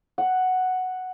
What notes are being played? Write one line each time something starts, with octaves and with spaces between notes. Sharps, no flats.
F#5